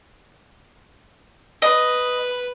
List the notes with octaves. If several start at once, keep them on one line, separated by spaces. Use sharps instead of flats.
B4 D#5